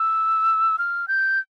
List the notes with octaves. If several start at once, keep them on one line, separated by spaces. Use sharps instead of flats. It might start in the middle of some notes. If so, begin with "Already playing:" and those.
Already playing: E6
F6
G6